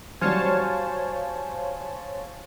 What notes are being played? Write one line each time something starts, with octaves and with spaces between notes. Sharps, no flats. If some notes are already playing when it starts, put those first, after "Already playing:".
F#3 G3 C5 C#5 F5 G#5 A5